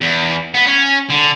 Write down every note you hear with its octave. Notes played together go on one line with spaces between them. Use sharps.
E2
B3
C#4
D3